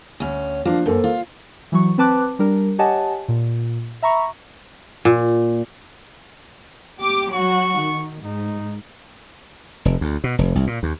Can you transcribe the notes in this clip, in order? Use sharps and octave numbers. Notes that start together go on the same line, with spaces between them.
D2 C#4
F3 A#3 D4
F#2 A#3 A4 C5
F4
E3 F#3 C#6
C4 B4 A5 D6 F#6
G3 D4 A#4
G4 C#5 D#5 F#5 G#5 A5
A#2
E5 A#5 B5 C#6
A#2
G4 D6
F#3 F#4 C#6
D#3
G#2 D#4
F1
D2
B2
F1
C2
A#2
D#2